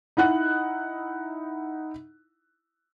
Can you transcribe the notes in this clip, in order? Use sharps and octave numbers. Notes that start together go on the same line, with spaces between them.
D#4 E4 F#5 F#6